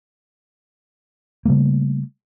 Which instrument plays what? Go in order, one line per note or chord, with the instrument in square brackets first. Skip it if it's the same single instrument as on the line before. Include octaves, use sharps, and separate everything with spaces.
[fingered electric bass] C#3 G3 A3 A#3